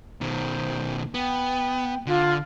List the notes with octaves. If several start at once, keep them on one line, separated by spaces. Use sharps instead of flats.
B2 D#3 C5
B3 G5
D3 F4